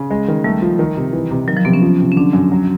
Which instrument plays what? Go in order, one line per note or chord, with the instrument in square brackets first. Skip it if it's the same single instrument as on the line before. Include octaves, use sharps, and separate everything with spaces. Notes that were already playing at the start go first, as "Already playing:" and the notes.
Already playing: [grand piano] C#3
G#3
D#3
[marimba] G3 [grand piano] A3
[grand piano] F3
D#3
C3
E3
C3
[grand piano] D#3 [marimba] F#3
[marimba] F3
[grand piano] C3 [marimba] B3
[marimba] C#4
[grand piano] F3
C3
[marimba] C#4
[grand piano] D3 [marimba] D4
[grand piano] F#2
F#3